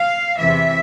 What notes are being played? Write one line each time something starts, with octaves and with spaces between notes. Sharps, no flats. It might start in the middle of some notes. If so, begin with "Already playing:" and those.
Already playing: F5
E2 C3 E3 E5